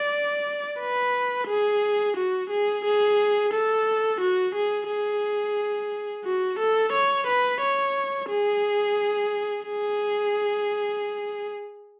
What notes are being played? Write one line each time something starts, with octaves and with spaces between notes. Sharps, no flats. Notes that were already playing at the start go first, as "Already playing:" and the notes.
Already playing: D5
B4
G#4
F#4
G#4
G#4
A4
F#4
G#4
G#4
F#4
A4
C#5
B4
C#5
G#4
G#4